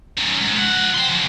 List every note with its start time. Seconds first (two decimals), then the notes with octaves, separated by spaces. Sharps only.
0.18 F#2 D#3
0.41 G#2
0.56 F3 F#5
0.95 G5 C6
1.08 C#3 F3